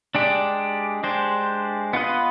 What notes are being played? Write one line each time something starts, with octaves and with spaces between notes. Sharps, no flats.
G#3 D4 G4 D5
G#3 D4 G4 C5
B3 F4 B4 D#5